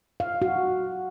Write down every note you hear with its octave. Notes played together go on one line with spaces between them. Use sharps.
F5
F#4